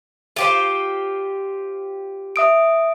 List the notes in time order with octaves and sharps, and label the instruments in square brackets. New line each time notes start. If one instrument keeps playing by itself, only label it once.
[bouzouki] F4 G4 C5
[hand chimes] E5 D#6 D7